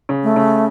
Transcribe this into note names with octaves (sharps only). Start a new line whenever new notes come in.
C#3
A3
C#3